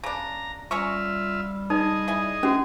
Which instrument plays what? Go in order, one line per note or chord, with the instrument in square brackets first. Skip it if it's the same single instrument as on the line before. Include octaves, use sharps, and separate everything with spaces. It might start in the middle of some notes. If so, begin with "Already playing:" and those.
[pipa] C#3 D4 [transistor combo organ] A#5
[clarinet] G3 [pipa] C#4 A#5 C#6 [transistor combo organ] F4 E5
[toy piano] D#4 [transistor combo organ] G#4 D#5
[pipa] E4 G#5
[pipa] E3 [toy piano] C#4 F#4